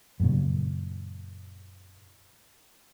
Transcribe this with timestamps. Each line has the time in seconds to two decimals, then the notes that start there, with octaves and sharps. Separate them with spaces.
0.20 F#2 A#2 C#3